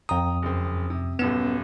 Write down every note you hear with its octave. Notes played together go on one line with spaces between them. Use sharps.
F2 G5 A#5 D#6
F#1 C4
C3
D#1 F#2 B3 E7